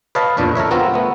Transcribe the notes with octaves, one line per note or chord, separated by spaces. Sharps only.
B4 C#5 D#5 F5 A5
E2 A#2 D4 B4
A4 A#4 C#5 E5
B3 C4 F4 F#4 A#4
A3 B3